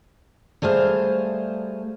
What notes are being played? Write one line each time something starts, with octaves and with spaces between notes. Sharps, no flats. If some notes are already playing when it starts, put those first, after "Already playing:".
G3 A3 G#4 C5 F5